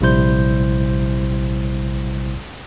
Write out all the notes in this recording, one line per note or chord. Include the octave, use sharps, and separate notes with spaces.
A#1 C3 G3 E4 C5 G6